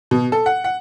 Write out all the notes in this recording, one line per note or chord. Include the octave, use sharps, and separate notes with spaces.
B2
A4
F#5
F#5